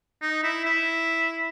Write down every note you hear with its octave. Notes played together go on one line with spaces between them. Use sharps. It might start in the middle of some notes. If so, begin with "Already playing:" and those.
D#4
E4
E4